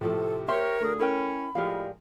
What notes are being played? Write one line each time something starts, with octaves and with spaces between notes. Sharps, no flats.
A2 C3 F3 A3 A4
G4 A#4 C5 C#5 E5 C6 C#6 F6
D2 A#2 A3 G#4
C#4 E4 A#4 G5 B5
A2 F3 G#3 G4 A#4 D5 F5 F6